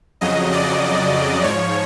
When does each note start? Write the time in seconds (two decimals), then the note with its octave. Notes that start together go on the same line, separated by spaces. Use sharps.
0.21 F2 C#3 F#3 D#5
0.52 D5
1.43 G#2 F3 C#5